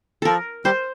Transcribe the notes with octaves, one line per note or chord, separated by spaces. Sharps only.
F3 A4 A#4
G3 C5